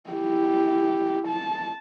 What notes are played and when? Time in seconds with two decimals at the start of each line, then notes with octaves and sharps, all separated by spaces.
0.10 E4 G4
1.28 A5